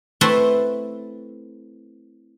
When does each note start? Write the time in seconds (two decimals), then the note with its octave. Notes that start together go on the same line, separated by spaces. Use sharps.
0.21 A3 C4 E4 B4 A5 C6